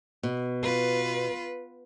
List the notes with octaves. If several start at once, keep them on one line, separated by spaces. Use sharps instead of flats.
B2
F4 B4